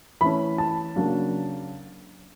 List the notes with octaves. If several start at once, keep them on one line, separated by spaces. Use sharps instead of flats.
E3 A3 C#4 B5
A5
C#3 F#3 A#3 D4